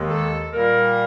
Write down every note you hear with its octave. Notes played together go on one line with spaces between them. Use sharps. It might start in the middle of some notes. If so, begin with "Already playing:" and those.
Already playing: D#2 D#3 G#3
A4
A#2 G3 A#3 A#4